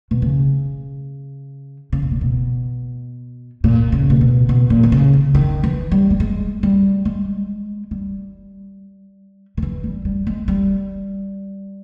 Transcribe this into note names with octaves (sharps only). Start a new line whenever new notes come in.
B2
C#3
C#3
B2
A#2
B2
A#2
C#3
A#2
B2
B2
A#2
D#3
C#3
C#3
D#3
E3
G3
G3
G#3
G3
G#3
G3
D#3
E3
G3
G3
G#3
G3